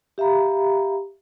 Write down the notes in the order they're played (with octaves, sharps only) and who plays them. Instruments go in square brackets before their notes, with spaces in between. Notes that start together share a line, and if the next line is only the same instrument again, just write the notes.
[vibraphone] G4 E5 F5 A#5 B5